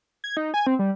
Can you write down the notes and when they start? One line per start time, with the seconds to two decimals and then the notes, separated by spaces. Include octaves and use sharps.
0.24 G#6
0.37 D#4
0.54 G#5
0.67 C4
0.79 G3